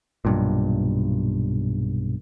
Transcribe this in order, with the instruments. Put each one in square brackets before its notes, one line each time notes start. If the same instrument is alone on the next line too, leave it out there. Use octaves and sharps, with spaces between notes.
[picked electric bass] B1 G2 A#2